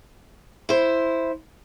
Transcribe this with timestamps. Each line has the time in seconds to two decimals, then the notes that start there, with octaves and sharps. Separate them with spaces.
0.69 E4 C5